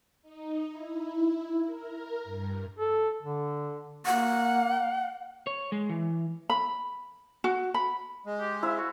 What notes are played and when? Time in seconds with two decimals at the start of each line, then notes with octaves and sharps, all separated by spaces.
0.22 D#4
0.69 E4
1.66 A#4
2.24 G2
2.79 A4
3.22 D3
4.06 A#3 F#5
5.47 C#5
5.72 G#3
5.89 E3
6.50 B5
7.44 F#4
7.74 B5
8.26 G#3
8.40 G4
8.63 E4 C5 E5 F5
8.78 F#4